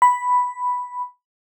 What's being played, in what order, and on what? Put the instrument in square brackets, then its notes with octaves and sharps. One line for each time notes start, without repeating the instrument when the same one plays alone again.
[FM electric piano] B5